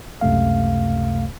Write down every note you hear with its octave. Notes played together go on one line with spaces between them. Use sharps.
C#2 F#2 C3 A3 F5